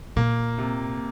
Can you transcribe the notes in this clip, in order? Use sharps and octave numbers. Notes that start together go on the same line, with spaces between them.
A#2 A#3
C3